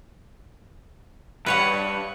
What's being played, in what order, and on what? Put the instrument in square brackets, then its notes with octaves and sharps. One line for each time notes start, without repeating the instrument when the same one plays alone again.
[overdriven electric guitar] G2 [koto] B4 C#5 F#5